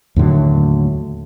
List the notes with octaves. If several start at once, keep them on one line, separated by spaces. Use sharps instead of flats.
D#2 A2 D3 F#3